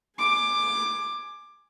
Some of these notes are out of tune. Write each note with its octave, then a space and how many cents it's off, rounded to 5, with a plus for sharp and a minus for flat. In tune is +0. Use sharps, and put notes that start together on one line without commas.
G#5 +5 D6 +15